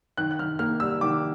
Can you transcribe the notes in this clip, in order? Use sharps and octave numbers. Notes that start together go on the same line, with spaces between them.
D#3 F#6
F#6
D#3 F6
A#3 F6
G3 E6
D#3 D6